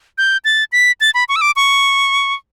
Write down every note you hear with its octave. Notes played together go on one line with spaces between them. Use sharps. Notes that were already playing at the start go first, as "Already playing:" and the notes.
G6
A6
B6
A6
B5
C#6
E6
D6
C#6